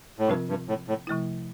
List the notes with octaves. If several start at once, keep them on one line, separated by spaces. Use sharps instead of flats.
A2
G2 C3 F3 C4 F4 A#4
G2
A2
A2
C3 F3 A3 E4